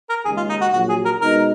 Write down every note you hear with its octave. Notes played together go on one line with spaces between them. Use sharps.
A#4
D#2 C#3 G#3 G#4
F4
D#4
F#4
A#1 A#2 F#3 F#4
G#4
A#4
B2 G#3 D#4 A#4